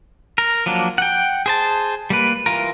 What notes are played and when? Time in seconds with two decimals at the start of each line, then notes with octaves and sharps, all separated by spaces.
0.38 A#4
0.66 F3 F#3 A#3 D4
0.98 F#5 G5
1.46 G#4 C5 A5
2.10 G3 A#3 B4
2.46 E3 F4 A#4